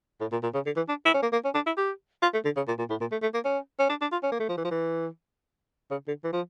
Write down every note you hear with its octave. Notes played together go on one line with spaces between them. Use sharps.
A2
A#2
A#2
C#3
D3
E3
D4
E4
C#4
A#3
A#3
C#4
D4
E4
G4
F4
A3
D3
C#3
A#2
A#2
A2
A#2
A3
A3
A#3
C#4
C#4
D4
D4
F4
C#4
A#3
A3
F3
E3
F3
E3
C#3
D3
E3
F3